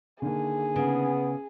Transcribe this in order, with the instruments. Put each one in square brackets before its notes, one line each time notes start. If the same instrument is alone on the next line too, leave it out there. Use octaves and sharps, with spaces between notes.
[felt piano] D3 D#3 A#3 [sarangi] G#4
[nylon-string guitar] C#3 [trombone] B3